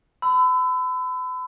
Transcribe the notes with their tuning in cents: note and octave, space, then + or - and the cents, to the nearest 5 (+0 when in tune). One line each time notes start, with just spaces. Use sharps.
B5 +40 E6 +0